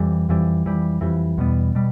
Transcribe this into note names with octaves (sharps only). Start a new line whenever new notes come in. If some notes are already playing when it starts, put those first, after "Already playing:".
Already playing: F2 E3 G3
F2 E3 G3
F2 E3 G3
F2 E3 G3
E2 B2 G3 B3
B2 G3